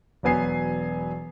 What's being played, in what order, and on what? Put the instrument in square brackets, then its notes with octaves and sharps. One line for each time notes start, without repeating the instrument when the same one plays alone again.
[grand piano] E1 F#3 B3 G#5 C7